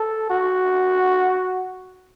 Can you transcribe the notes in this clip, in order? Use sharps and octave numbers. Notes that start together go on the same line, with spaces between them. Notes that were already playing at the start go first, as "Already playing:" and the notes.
Already playing: A4
F#4